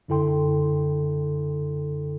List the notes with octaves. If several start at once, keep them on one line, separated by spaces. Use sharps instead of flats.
F#2 D3 E4 A4 G5 C6